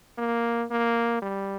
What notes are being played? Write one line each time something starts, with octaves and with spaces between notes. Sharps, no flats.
A#3
A#3
G3